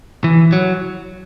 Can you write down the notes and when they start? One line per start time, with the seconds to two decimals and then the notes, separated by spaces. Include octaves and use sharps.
0.24 E3
0.53 F#3